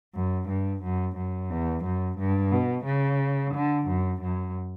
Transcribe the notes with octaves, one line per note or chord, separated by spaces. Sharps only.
F#2
G2
F#2
F#2
E2
F#2
G2
B2
C#3
D3
F#2
F#2